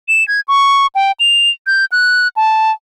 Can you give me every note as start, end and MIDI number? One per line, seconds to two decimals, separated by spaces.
0.08 0.26 100
0.28 0.41 92
0.48 0.87 85
0.95 1.12 79
1.20 1.50 101
1.67 1.85 91
1.92 2.28 90
2.36 2.72 81